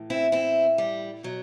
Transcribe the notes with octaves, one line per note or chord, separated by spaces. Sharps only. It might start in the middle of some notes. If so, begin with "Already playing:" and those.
Already playing: A2 E3
C4 E4
C4 E4
G3
B2 F#3